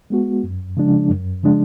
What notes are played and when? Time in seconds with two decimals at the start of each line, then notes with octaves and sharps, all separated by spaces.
0.10 G#3 B3 F#4
0.44 F#2
0.77 C#3 F3 G#3 D4
1.10 F#2
1.43 C#3 F3 G#3 D4